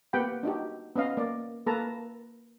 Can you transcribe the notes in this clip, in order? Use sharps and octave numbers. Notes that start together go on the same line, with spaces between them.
A#3 B3 G4 F#5 G5 B5
D4 D#4 F#4 G4
B3 C#4 D#5 F5
A#3 D5
A#3 A4 B4 A5 A#5